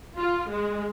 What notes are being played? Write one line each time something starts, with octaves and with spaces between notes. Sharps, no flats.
F4
G#3